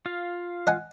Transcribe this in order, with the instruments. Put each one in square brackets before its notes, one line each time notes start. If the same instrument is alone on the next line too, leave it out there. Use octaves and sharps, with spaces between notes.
[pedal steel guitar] F4 F5
[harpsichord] D#5 F#5 G#5